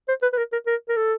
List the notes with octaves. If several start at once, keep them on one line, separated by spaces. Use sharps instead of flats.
C5
B4
B4
A#4
A#4
A#4
A#4
A4